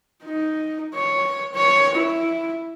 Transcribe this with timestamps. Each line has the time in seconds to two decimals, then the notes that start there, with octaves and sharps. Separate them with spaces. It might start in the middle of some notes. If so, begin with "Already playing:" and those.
0.24 D#4
0.95 C#5
1.54 C#5
1.95 E4